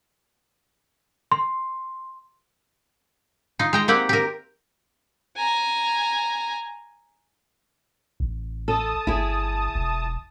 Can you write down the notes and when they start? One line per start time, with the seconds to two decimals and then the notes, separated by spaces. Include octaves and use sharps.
1.32 C6
3.59 D#4 F4
3.73 G#3 G5 A#5
3.88 A#3 C4 G4 F#5
4.09 G4 A#4
5.37 G#5 A#5
8.20 A1
8.68 A4 A5 D#6
9.07 G1 E4 G#4
9.75 E1